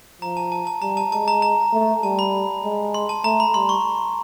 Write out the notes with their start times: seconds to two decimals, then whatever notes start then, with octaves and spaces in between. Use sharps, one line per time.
0.22 F3 A#5
0.37 A5
0.52 A5
0.67 A5
0.82 G3 A#5
0.97 A5
1.12 G#3 A5
1.28 A#5
1.42 A#5
1.73 A3
2.03 G3 A5
2.19 B5
2.64 G#3
2.94 C6
3.09 A5
3.24 A3 A#5
3.40 B5
3.54 G3 C6
3.69 C#6